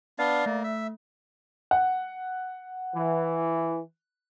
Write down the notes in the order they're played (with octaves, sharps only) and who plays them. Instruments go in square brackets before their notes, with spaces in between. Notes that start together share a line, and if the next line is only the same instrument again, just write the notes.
[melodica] B3 D4 F5 [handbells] D5
[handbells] A3 [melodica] A#3
[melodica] E5
[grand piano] F#5
[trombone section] E3